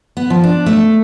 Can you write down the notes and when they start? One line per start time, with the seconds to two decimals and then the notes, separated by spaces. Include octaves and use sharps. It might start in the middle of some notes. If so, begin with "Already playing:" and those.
0.17 B3
0.30 F3
0.44 D4
0.66 A3